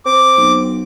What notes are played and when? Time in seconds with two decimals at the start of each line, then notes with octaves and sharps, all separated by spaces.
0.06 C4 D6
0.38 B1